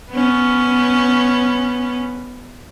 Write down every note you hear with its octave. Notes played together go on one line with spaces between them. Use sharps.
B3 C#4